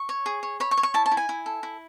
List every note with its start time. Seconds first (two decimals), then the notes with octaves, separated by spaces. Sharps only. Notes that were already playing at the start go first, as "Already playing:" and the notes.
Already playing: C#6
0.09 C#5
0.26 G#4
0.43 C#5
0.60 C#5 B5
0.71 C#6
0.77 C#5
0.83 C#6
0.94 E4 A5
1.06 A5
1.11 E4
1.17 G#5
1.29 E4
1.46 A4
1.63 E4